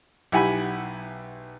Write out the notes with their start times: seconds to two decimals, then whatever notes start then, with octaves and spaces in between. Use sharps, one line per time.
0.32 B1 E4 G4 F#5 G#5 B5